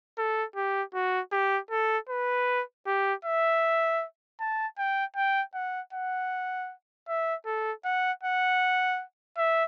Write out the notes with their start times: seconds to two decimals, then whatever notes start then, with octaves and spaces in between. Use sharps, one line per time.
0.18 A4
0.56 G4
0.94 F#4
1.32 G4
1.71 A4
2.09 B4
2.87 G4
3.25 E5
4.40 A5
4.78 G5
5.16 G5
5.54 F#5
5.93 F#5
7.08 E5
7.46 A4
7.85 F#5
8.23 F#5
9.37 E5